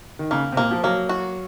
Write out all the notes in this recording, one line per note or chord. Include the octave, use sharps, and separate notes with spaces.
D#3
C#3 A#3
C3
A#2 A#3
F3
F#3 A#3
F#4